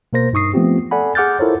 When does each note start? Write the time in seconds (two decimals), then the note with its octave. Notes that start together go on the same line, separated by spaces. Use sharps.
0.13 B2 A#3 A#4 C5 A#6
0.33 G2 D#4 C#6 D#6 C7
0.54 F3 A3 B3 C4 F4 G4
0.91 A4 D5 F#5 G#5 B5
1.15 G#4 F#5 D6 F6 G6 A6
1.39 E4 F4 A4 A#4 C5 C#5